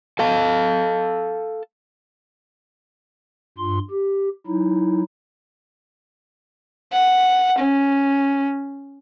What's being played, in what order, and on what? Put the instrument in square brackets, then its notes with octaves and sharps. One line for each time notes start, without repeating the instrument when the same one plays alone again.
[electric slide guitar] A4 F5 A5
[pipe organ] G2 F4 C6
G4
F#3 D#4 E4
[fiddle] F#5
C#4